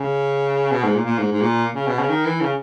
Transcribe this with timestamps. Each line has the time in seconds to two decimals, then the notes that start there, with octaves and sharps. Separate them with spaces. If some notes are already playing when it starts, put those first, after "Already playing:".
Already playing: C#3
0.71 B2
0.84 G#2
0.95 A#2
1.06 A#2
1.18 G#2
1.32 G#2
1.41 A#2
1.75 C#3
1.87 B2
1.99 C#3
2.09 D#3
2.25 E3
2.41 C#3